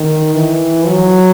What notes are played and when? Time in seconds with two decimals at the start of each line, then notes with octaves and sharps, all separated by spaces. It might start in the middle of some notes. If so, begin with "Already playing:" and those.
Already playing: D#3
0.35 E3
0.86 F#3